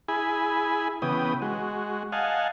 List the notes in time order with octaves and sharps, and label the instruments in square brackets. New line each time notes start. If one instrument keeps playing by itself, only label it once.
[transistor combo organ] E4 G#4 G#5 B5
C#3 E3 B3 G5 D#6
G#3 F#4
D#5 F5 F#5 G#5 A5